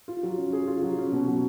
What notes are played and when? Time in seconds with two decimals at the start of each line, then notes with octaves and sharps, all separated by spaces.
0.08 F4
0.23 F#3
0.38 C#4
0.53 G#4
0.67 F4
0.82 F#3
0.98 C#4
1.12 B2
1.27 F#3